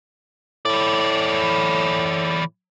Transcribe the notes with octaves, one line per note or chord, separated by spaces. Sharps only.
A2 E3 D5